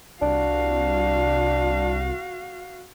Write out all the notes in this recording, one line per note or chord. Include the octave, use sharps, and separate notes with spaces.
C2 D4 F#4 F5